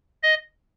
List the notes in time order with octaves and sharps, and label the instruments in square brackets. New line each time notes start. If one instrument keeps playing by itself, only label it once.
[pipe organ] D#5